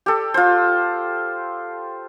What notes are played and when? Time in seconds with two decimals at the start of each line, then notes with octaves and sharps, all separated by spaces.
0.06 G4 A4
0.34 F4 C5